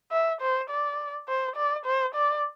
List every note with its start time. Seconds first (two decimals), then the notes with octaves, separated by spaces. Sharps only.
0.12 E5
0.41 C5
0.70 D5
1.28 C5
1.56 D5
1.85 C5
2.15 D5